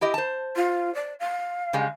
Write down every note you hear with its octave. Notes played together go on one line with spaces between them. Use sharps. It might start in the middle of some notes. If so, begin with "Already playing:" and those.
E4 G4 D#5
C5 A5
F4
D5
F5
C#3 G3 G#3